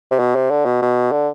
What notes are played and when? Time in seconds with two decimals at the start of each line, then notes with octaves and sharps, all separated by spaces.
0.11 C3
0.19 B2
0.35 C3
0.51 D3
0.65 B2
0.82 B2
1.12 D3